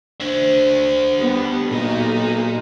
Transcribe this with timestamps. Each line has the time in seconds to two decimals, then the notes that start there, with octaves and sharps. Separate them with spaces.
0.21 D4 C5 E5
1.17 G3 B3 G4
1.71 B1 A#2 D#4